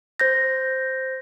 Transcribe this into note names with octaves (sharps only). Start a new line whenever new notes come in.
C5 G6 A#6